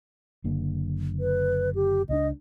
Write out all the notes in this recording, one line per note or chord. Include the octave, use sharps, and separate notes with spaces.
F#1 D3 A#3
B4
G4
C#2 C#4 D4 D#5